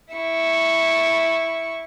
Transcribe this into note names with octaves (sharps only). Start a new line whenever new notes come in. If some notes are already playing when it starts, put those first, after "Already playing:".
E4 C#6